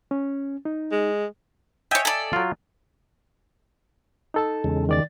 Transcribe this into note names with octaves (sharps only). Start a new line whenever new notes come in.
C#4
D#4
G#3
C#5 D#5 E5 G5 G#5
A4 D5
F#3 F4
D#4 A4 A5
E2 C#3 G#3
D#3 D5 A6